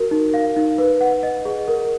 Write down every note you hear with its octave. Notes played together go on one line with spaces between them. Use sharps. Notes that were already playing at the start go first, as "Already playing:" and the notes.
Already playing: F#4 A#4
D#4
F5
D#4
B4
F#5
D#5
G#4
A#4